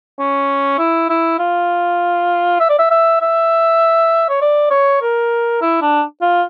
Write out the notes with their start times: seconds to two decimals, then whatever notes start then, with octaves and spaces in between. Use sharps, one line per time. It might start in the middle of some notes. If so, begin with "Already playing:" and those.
0.19 C#4
0.78 E4
1.10 E4
1.39 F4
2.60 E5
2.69 D5
2.78 E5
2.91 E5
3.21 E5
4.29 C#5
4.41 D5
4.71 C#5
5.01 A#4
5.61 E4
5.81 D4
6.21 F4